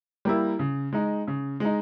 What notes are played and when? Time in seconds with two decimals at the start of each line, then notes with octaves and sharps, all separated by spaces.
0.25 G3 A#3 E4
0.59 C#3
0.93 G#3 D#4
1.27 C#3
1.60 G#3 D#4